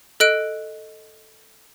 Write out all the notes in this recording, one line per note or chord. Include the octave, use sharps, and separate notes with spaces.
A4 D#5 F#6 D7